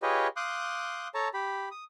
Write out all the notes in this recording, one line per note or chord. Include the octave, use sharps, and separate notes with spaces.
F4 G4 G#4 B4 C#5 D#5
F5 C6 D6 D#6 F#6 G6
A4 C#5 A5 A#5
G4 B5
D#6